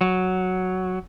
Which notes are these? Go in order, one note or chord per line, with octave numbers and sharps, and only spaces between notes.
F#3